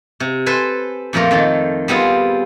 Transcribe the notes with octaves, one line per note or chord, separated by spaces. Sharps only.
C3
A4 B4 C5 G#5
F2 A#2 F3 A3 A#4
F2 D#3 A4 A5
G3 B3 C4 F4 G#4